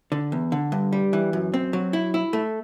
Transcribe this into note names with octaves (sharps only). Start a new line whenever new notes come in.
D3
E2
D3
G2
G3
E3
F#2
C4
F#3
E4
E4
A3